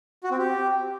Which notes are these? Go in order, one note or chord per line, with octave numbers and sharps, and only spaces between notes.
F#4
C4
G4